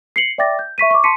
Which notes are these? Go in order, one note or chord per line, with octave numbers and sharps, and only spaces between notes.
C7 C#7 F#7
D5 E5 G5 D6 A6 A#6
G6
E5 C#6 B6 D#7
C#6 D6
A5 C6 B6 C#7 D#7